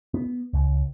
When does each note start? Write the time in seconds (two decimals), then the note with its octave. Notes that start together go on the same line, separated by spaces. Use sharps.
0.14 B3
0.53 C#2